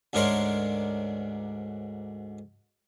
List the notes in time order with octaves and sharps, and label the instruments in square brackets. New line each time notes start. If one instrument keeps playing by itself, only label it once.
[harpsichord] D2 G#2 D4 A#4 C#5 C6